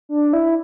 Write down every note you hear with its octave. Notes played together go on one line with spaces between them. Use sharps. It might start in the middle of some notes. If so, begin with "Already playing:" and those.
D4
E4